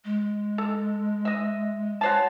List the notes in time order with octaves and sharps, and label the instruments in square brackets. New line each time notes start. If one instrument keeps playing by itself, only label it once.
[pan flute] G#3
[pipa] A4
D#5 E5
[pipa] F#4 C5 A5 [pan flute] C#5